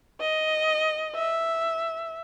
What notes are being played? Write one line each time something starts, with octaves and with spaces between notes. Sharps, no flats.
D#5
E5